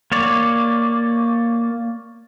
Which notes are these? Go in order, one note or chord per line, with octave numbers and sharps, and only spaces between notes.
A#3 C#5 D5